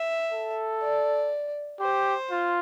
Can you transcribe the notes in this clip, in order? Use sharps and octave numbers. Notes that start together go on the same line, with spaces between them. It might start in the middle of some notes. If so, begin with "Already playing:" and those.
Already playing: E5
A4
D5
G4 C5
F4